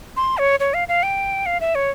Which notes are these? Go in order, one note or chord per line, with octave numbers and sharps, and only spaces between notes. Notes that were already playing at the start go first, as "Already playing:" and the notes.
C6
C#5
C#5
F5
F5
G5
F5
E5
C#5